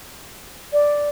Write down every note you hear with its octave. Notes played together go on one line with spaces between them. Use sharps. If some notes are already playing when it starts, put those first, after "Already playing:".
D5